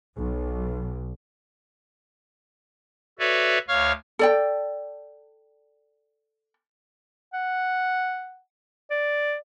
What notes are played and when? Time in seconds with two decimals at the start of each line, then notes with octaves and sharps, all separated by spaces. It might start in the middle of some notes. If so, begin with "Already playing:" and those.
0.18 B1
3.19 F#4 A4 B4 C#5 D5 E5
3.68 D2 C#5 F5 C#6 F6
4.19 A4 D5 G5
7.34 F#5
8.91 D5